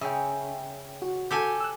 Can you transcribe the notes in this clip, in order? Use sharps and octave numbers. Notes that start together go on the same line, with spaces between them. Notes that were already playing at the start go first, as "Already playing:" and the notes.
C#3 E5 G5
F#4
F#4 G4 A4 G#5 G6
E6 F#6